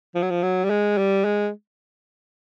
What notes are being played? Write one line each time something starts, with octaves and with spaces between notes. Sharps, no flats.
F3
F#3
F3
F#3
G3
G#3
G3
G#3